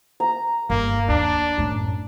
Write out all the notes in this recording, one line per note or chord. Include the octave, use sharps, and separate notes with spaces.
A#5
G1 A#3
D#2 D4
F#2 A2